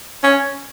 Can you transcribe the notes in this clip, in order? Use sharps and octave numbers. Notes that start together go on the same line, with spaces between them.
C#4